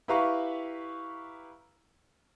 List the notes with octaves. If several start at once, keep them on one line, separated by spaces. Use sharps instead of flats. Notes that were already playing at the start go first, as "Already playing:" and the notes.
E4 G4 B4 F5 A#5 C#6